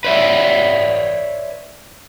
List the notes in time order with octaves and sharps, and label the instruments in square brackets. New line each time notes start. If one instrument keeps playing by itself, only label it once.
[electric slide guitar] B4 C#5 D5 E5